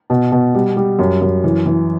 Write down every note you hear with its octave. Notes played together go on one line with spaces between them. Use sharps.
B2
B2
G3
G3
F#2
F#2
E3
E3